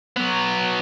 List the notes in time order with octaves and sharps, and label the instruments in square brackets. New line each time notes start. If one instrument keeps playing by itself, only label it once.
[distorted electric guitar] F#3 B3